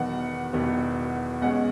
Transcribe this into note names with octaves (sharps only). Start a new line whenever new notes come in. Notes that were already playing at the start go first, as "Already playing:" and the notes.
Already playing: E1 E2 D#3 F#3 B3 F#5
E1 E2 D#3 F#3 B3
B1 B2 G#3 C#4 F#5